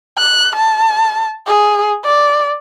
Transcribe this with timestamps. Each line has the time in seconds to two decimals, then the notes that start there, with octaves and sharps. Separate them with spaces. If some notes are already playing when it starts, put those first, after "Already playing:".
0.18 F#6
0.56 A5
1.47 G#4
2.05 D5